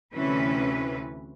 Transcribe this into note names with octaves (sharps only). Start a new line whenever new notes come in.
D2 C3 E3 C#4 B4